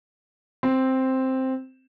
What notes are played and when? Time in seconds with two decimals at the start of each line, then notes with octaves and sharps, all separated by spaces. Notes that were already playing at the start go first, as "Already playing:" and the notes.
0.63 C4